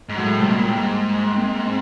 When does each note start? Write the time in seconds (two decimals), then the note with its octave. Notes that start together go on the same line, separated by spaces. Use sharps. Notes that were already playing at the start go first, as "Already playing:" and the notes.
0.09 G#2
0.17 A2 F#3 G#3
0.37 C3 G3 A3
0.49 B2
0.56 A#2 G#3 A#3
0.67 A2
0.76 G#2
1.36 A#3 C4
1.65 C4